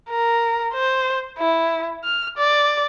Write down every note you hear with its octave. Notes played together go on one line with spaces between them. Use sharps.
A#4
C5
E4
F6
D5